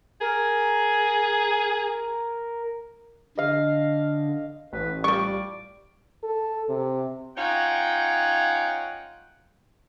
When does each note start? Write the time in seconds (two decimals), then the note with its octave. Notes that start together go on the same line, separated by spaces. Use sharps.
0.21 G#4 A#4
3.38 D3 D#5 F5
4.73 A1 B4
5.04 F3 G3 D5 C#6
6.23 A4
6.69 C3
7.37 C#4 D#4 F4 C#5 F#5 G5